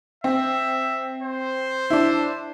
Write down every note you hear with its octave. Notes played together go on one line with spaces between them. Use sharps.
C4 E5
C5
D4 E4